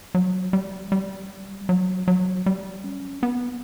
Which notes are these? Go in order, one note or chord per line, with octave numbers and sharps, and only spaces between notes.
F#3
G3
G3
F#3
F#3
G3
C#4
B3